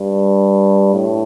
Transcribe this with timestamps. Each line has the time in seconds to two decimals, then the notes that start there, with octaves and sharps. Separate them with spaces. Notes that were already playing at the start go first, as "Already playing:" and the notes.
Already playing: G2
0.94 A2